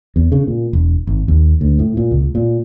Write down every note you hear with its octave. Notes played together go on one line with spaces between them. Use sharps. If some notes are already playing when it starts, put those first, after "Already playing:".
E2
C#3
A#2
E1
G#1
D#2
D2
A2
A#2
C#2
A#2